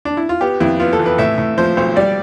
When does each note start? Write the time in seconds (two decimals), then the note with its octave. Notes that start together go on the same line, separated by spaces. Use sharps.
0.05 D4
0.17 E4
0.29 F4
0.41 B3 G4
0.60 F2 E4
0.80 B3 F4
0.93 A4
0.99 E3
1.06 B4
1.18 A2 E5
1.38 A2
1.58 F3 C5
1.77 B1 C5
1.96 G3 D5